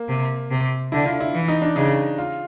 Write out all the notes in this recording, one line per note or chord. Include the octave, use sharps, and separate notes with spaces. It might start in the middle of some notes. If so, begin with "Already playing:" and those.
Already playing: A#3
C3
C3
D3 E4
F4
E4
E3
D#4
D4
C#3 D#4
F4